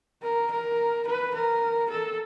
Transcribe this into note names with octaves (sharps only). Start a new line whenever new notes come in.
A#4
A#4
B4
A#4
A4